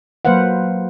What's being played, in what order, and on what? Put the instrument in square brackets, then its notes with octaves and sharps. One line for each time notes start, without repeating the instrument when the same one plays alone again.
[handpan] F#3 A#3 B4 C5 F5 F#5